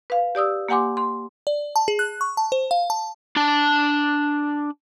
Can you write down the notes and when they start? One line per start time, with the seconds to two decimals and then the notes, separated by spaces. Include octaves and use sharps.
0.10 B4 F5
0.35 G4 D5 D#6 E6
0.68 A#3 G4 F#5 G#5 C6 D6
0.97 C6
1.47 D5
1.76 A5
1.88 G#4
1.99 F#6
2.21 C#6
2.37 A5
2.52 C5
2.71 F5
2.90 A5
3.36 D4 A5